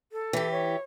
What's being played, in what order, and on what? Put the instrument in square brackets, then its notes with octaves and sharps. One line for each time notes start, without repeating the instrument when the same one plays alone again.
[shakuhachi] A4
[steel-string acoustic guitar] E3 G4
[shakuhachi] C#5